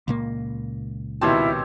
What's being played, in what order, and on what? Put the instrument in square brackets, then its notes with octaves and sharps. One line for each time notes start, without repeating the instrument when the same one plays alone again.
[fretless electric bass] C#2 A#2 A#3
[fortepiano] D#2 B2 A5 [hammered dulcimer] C4 G4 C#5 [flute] E4